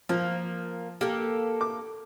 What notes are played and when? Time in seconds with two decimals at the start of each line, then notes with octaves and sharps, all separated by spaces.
0.09 F3 A#3
1.01 A#3 G4 A4
1.61 D6